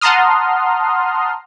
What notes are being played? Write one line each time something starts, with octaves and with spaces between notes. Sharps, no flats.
F#5 A5 A#5 C6 D#6 F6